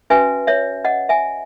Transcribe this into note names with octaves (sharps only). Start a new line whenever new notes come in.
C#4 F#4 B4 E5 G#5
C#5 E5
D#5 F#5
E5 G#5